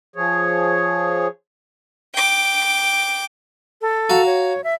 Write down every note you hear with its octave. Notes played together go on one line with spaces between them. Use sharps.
F3 G#4 C#5
G5 D6
A4
F#4 F5 A#5
C#5
E5